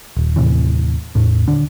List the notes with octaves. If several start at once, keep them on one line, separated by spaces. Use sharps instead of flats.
D#1
D#2 A2 C3 E3
E2 A2 A3
D#1 D3 D4